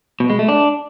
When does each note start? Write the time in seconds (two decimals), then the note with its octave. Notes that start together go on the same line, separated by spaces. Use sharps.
0.20 B2
0.30 G#3
0.39 A3
0.48 D4